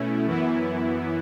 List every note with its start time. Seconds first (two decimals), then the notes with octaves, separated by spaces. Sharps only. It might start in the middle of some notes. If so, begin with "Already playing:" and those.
Already playing: B2 A3 C#4 E4
0.26 F#2 E3 B3 E4